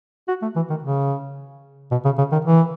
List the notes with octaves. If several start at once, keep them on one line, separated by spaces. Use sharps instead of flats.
F#4
A3
E3
D#3
C#3
B2
C#3
C#3
D#3
E3